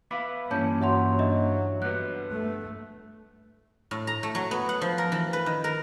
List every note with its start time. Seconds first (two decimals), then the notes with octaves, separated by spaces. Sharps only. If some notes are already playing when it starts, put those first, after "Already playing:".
0.11 B3 E5 F5 B5 D6
0.51 G2 E3 A#3 C#4 E4 C#5 A5 G6
0.81 F#3 E5 F#5 C6
1.19 D4 D#5 E5
1.82 G2 B3 F#6
2.29 A3
3.91 A2
4.07 A#5
4.23 A3
4.35 F#3
4.51 B3
4.69 F#5
4.81 F3
4.98 A#4
5.12 E3
5.33 B4
5.46 D#3
5.64 A#4